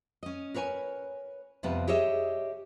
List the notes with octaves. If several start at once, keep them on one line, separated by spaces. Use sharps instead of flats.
C#4 D#5
A#4 B4 C#5 G5 G#5
F2 C3 F3 G3 B3 B4
G4 G#4 C#5 D#5 E5